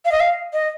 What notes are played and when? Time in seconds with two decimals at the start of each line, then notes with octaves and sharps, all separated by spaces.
0.05 F5
0.12 D#5
0.20 F5
0.53 D#5